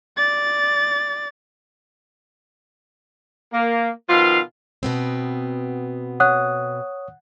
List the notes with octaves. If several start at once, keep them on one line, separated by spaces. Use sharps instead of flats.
D5 A6
A#3
B2 D#3 F3 F4 F5 C6
B2 B3 C4
C#5 F#5 D#6 F#6